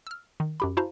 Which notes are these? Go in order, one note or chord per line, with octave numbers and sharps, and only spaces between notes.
E6 F6
D#3
F#2 G4 B5
E4 F#4 C5 F5 A5 A#5